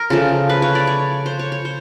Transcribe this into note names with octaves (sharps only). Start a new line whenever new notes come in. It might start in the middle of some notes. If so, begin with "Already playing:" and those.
Already playing: A#4
C#3 F3 A3
B4
C#5
D5
C#5
C5
C#5
C#5
C5